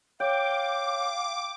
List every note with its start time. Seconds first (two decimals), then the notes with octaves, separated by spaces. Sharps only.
0.20 C#5 F5 G5 D6